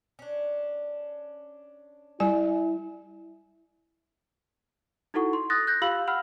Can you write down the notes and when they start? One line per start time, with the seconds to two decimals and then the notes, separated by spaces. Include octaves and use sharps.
0.19 C#4 D4
2.20 G3 E4 G#5
5.14 D#4 E4 F#4 A4 F#5 C#6
5.33 C6
5.50 D#6 F#6 A6 A#6
5.67 F#6 G6 A#6
5.82 F4 G4 F5 B5 E6 F#7
6.07 F#5 B5 E6 F6